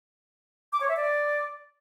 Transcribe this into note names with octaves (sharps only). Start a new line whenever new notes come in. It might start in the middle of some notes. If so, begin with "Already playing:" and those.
D6
C#5
E5
D5